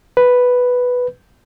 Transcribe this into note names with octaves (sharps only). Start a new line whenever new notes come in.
B4